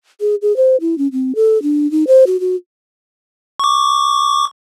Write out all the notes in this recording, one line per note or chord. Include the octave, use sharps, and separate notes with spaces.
G#4
G#4
C5
E4
C#4
C4
A4
D4
D#4
C5
F#4
F#4
C#6 D6